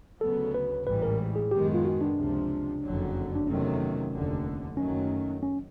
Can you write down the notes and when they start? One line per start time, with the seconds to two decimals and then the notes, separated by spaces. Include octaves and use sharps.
0.21 D2 C#3 F#3 B3 A4
0.54 B4
0.86 A1 G#2 E3 G3 B4
1.03 A#4
1.36 G#4
1.51 F#2 D#3 G#3 B3 G4
1.74 F4
1.85 F#4
2.01 D4
2.17 C#2 C3 F3
2.83 F#1 F2 D3 F#3
3.35 D4
3.47 E2 C3 D#3 F#3 A3 C#4
4.12 F1 D#2 D3
4.77 F#1 F#2 D#3 F#3 A3 C#4
5.43 C#4